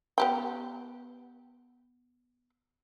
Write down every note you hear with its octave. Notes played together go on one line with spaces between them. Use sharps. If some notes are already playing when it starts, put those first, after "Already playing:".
B3 G4 G5